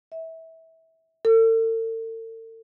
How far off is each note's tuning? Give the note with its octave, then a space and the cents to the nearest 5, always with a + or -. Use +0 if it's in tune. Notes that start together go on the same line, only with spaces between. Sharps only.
E5 -20
A4 +45